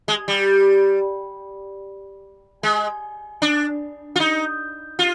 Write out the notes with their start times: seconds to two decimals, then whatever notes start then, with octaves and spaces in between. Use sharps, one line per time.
0.08 G#3
0.28 G3
2.63 G#3
3.42 D4
4.16 F4
4.20 D#4
4.99 F4